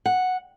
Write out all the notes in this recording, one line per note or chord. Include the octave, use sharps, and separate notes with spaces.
F#5